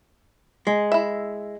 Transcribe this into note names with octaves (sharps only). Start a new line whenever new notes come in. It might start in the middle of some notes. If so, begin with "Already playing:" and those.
G#3
E4 E5